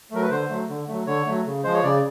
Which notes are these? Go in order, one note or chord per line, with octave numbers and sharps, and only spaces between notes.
F#3 A3 A#4
B4
D3 C5
F#3 A3
D3
F#3 A3
D3 C#5
F#3 A3
C#3
F3 G#3 C5
C#5
C#3 D5